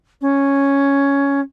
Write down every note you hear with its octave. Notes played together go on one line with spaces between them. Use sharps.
C#4